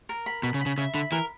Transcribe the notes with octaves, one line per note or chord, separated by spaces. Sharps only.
A#4
B5
B2 B5
C#3
B5
C#3
C#3 E5
D3 B5
E3 A#4